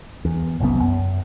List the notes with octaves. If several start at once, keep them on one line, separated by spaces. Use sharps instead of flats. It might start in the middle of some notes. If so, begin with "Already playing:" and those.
E2
F#1 C2 F#2 B3
F#2